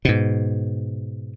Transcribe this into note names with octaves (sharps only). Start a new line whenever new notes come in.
G#2 B2